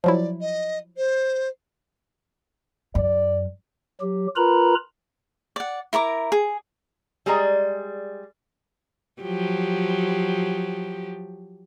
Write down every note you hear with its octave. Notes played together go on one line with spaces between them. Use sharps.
F3 F#3 E4 D5
D#5
C5
F#2 D5
F#3 G4
F4 A#4 B4 A#5 B5
D5 F#5
E4 A#4 A#5 D6
G#4
G3 G#3 G#4 D5 A#5
F3 F#3 G4